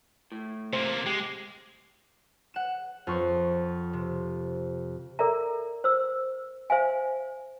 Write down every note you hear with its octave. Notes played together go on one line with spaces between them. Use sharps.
A2
C3 A#3 C5
G#3 G4
F#5 E7
F2 F4 C#6
C3
A4 A#4 D5 E5 A#5
C5 E6
C5 E5 F5 G#5